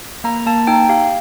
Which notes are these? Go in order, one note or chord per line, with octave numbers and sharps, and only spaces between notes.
A#3 A#5
A#3 A5
D#4 G5
G4 F5